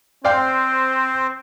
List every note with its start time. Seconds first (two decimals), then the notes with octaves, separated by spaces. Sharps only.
0.25 C4 C5 D5 F5 G5